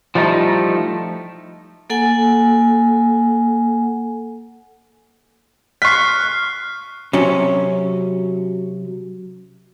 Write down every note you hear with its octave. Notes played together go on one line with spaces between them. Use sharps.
F3 G3 A3 D#4 E4
A#3 A4 F#5 G#5
C#6 F6 F#6 B6 C7
C3 F#3 C#4